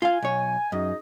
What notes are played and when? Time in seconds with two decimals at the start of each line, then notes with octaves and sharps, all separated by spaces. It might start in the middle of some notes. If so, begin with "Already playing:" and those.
0.02 F4 F5 G#5
0.22 B1 C#5
0.72 F#2 D#4 G#4 D#5